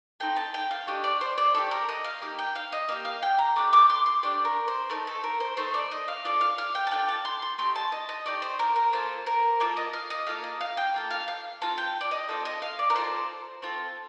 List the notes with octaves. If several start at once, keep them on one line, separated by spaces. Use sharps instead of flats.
C4 D#4 A4 G5
A5
G5
F5
A3 D4 G4 D#5
D5
C5
D5
A3 D4 G4 A4
A#4
D#5
F5
A#3 D#4 G4
G5
F5
D#5
A#3 D#4 G4 F5
F5
G5
A#5
A3 D4 G4 D6
D6
C6
C6
A3 D4 G4 D5
A#4
C5
A3 D#4 A4 A#4
A4
A#4
C5
A3 D#4 A4 C5
D5
D#5
F5
D4 F4 A4 D5
F5
F5
G5
A5
D4 F4 A4 G5
A5
C6
C6
A3 D#4 G4 C6
A5
D#5
D#5
A3 D#4 G4 D5
C5
A#4
A#4
A#3 F4 A4 C5
A#4
A#3 F4 A4 D5
D#5
F5
D#5
A#3 F4 A4 F5
D#5
F5
G5
A#3 F4 A4
F5
F5
C4 F4 A4 A5
G5
D5
D#5
C4 F4 A4
D#5
F5
D5
A#4
C4 F4 A4 C5
C4 F4 A4